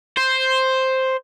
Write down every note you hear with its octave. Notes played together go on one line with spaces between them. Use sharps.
C5